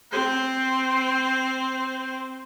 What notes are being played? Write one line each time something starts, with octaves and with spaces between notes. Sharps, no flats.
C4 C5